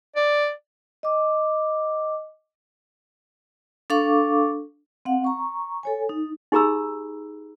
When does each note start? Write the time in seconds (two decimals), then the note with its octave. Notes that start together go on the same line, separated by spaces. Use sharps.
0.16 D5
1.03 D#5 D6
3.90 D4 A4 F5 C#6 D6
5.05 C4 F5 F#5
5.24 A#5 C#6
5.83 A4 C#5 G#5
6.09 D#4
6.52 D#4 G4 G#4 A#5 B5 E6